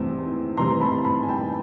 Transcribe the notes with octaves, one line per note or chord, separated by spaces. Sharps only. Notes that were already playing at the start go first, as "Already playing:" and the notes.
Already playing: E2 C3 E3 A3 C4
E2 C3 E3 A3 C4 A#5 C6
A5 B5
A5 B5
G#5
G5 A5